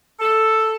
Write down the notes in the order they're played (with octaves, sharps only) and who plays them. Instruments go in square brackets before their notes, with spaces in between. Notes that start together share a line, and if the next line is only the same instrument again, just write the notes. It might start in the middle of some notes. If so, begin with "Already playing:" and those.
[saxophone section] A4